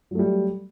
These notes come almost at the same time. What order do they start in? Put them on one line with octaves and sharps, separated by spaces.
F#3 A3 G3